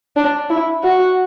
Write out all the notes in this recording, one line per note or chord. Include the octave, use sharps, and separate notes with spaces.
D4
E4
F#4